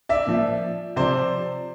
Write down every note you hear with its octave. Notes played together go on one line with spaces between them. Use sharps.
D5 E5
A#2 F3
C3 F3 C5 D5